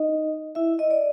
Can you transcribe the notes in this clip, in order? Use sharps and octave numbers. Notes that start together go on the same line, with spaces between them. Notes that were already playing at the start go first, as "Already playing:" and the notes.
Already playing: D#4 D#5
E4 E5
D#5
D5